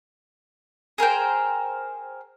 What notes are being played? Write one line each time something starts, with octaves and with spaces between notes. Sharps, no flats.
G#4 A#4 C5 G5